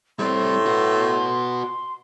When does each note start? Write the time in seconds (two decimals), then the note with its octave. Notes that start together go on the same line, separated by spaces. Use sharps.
0.19 A2 G3 C4 C6
0.66 F#4 B4